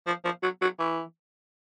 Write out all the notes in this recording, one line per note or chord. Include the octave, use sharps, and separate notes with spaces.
F3
F3
F#3
F#3
E3